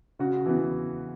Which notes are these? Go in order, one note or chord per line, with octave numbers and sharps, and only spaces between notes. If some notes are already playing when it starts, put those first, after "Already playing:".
C#3 F#4
E3 B3